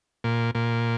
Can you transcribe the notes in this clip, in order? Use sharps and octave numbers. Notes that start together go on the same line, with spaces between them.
A#2
A#2